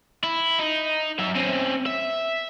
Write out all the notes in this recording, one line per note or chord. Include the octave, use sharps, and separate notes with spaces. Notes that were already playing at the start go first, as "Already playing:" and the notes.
E4
D#4
F#2 E5
C4 C#4
E5